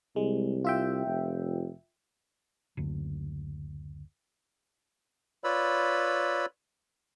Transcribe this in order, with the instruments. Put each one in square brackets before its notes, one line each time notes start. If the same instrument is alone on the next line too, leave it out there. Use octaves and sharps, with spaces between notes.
[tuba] C2 [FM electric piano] G#3
[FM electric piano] F4 E5 G5
[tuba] F1
[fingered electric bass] F#1 D2
[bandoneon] F4 B4 C#5 D5 B5 E6